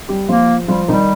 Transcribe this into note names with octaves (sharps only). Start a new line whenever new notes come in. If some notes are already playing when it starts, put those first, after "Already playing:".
G3 G4
F3 A#3 F4
F3 G3 F4
D#3 G3 D#4